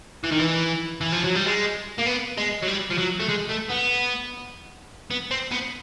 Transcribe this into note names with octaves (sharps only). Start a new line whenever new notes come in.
E3
D#3
E3
E3
F3
F#3
G3
G#3
A#3
B3
G#3
F#3
G3
F3
F#3
A3
G#3
A3
B3
B3
C4
B3